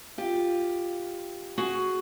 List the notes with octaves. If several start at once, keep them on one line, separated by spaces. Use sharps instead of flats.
F4 G4
F#4 G#4